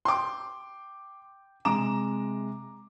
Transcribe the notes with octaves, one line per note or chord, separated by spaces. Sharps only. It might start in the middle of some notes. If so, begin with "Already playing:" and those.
G5 C6 D6
C3 G#3 A#5 D6 E7